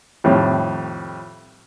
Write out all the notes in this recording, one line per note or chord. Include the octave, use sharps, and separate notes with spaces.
F2 A2 D#3 G3